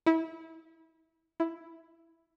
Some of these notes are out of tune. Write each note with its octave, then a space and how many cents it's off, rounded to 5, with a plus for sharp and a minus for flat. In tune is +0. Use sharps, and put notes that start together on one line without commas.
E4 -25
E4 +5